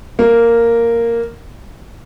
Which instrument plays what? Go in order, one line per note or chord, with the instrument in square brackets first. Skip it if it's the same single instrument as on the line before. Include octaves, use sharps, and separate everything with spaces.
[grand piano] A#3